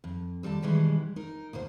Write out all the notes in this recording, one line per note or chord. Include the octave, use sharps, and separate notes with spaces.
F2
D#2 G3 A4 A5
B2 D#3 E3 G3 G#3
D#4 A#4
D2 B2 A#3 C5